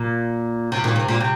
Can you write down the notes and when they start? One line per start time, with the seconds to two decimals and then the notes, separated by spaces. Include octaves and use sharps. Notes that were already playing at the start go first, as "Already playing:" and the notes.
Already playing: A#2
0.72 C3
0.84 A#2 D#3
0.96 C3
1.08 A#2
1.20 C3